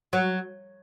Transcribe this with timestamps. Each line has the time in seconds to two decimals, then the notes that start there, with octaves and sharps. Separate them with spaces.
0.13 F#3